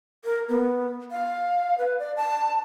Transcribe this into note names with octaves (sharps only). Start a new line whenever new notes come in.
A#4
B3
F5
B4
D5
A5